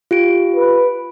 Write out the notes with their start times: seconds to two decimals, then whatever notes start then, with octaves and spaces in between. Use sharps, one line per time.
0.11 F4 G4 D7
0.56 B4